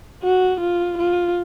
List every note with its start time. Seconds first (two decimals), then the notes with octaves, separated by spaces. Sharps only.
0.23 F#4
0.61 F4
0.98 F4